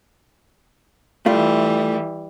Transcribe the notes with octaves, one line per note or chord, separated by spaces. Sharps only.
E3 G3 A3 F4